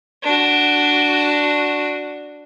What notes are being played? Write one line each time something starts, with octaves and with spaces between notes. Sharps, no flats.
D4 F#4